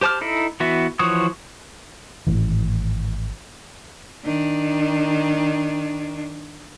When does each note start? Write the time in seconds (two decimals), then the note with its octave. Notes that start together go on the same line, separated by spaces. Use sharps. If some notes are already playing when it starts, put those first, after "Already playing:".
0.01 G4 C5 A5 D6 F6
0.21 D#4 E4 A4
0.60 E3 B3 F#4 E5
0.99 E3 F3 F#4 C#5 D#6
2.27 G#1 A2 E3
4.24 D#3 D4